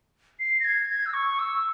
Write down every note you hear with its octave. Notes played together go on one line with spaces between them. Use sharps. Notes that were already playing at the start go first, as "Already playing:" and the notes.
C7
A#6
G#6
G#6
E6
C#6
E6